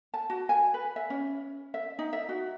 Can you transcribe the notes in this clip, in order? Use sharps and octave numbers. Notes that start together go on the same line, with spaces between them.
A5
F#4
G#5
B4
E5
C#4
E5
D#4
E5
F#4